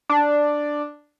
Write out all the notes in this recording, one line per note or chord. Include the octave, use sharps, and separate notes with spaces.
D4